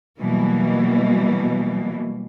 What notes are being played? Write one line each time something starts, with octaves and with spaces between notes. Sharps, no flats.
B2 E3 F#3 G3 A#3